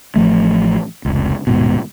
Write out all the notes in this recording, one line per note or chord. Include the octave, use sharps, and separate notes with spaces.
A1 F3 A3
F1 C#2
D#1 G#2 B2